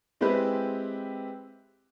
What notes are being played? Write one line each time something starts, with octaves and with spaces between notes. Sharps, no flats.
G#3 C4 E4 G4 B4